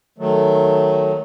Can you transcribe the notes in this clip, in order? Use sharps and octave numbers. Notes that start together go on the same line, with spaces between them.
D#3 F#3 A3